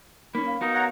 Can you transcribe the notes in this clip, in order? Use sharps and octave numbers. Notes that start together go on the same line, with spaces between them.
A#3 C#4 D#4 B5
F5
B3 D#4 F#4 A#4
C#5 F#5 A#5